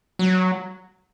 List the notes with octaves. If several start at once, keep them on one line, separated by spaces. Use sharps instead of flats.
F#3